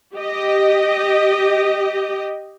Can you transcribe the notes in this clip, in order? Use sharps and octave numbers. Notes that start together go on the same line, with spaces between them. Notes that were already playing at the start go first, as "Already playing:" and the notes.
G4 D#5